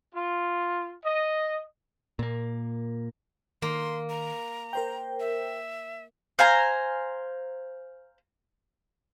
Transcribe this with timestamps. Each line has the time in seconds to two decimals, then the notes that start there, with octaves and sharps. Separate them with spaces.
0.15 F4
1.04 D#5
2.19 A#2 A#3
3.62 D#3 A#3 C6
4.10 A#5
4.73 A#4 C5 G5
5.20 E5
6.39 C5 F5 G#5 A#5